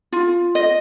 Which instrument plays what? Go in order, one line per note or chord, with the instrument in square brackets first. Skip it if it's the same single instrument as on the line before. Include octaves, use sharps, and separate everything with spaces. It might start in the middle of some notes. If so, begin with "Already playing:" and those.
[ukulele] F4
D#5